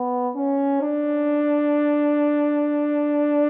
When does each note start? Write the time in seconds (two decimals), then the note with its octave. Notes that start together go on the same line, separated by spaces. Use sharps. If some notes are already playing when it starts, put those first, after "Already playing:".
Already playing: B3
0.35 C#4
0.82 D4